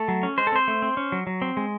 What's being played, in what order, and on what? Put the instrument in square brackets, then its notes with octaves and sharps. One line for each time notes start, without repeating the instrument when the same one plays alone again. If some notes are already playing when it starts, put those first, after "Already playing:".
Already playing: [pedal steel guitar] A3 A4
F#3
C#4
G#3 C5
A4
C4 C5
A3
C4
C#4
F#3
F#3
C4
G#3